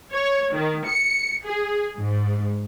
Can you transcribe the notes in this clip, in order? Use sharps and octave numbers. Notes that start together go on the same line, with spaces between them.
C#5
D#3
C#7
G#4
G#2